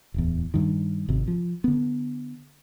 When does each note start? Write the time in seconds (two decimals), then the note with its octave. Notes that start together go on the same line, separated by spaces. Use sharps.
0.14 D1 E2
0.54 G2 D#3
1.09 G#1 C3
1.28 F3
1.64 D3 B3